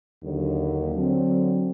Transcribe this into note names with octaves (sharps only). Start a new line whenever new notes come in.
D#2 D3 F#3
D3 F#3 C4